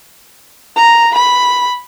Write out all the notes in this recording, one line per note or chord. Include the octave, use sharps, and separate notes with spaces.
A#5
B5